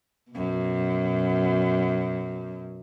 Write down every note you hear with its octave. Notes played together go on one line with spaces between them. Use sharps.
F#2 B2